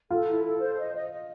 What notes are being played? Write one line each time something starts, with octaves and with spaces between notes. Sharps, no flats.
F4 A4
E4
A4
C5
D#5
D#5
D#5